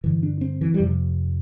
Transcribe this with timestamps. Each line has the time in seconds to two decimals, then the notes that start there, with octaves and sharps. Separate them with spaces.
0.04 G2 D3 E3
0.23 D4
0.41 C4
0.61 E3
0.74 G3
0.80 F2 C3 F3